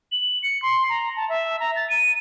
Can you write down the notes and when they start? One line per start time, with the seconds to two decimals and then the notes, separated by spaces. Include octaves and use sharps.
0.12 F#7
0.43 C#7
0.62 C6
0.89 A#5
1.16 A5
1.29 E5
1.60 A#5
1.76 A6
1.90 D#7